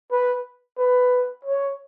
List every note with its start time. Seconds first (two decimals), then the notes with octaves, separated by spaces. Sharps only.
0.12 B4
0.78 B4
1.45 C#5